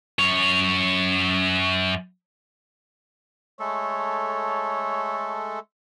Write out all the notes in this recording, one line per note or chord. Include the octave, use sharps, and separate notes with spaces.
F#2 C#5
G#3 A3 A4 C#5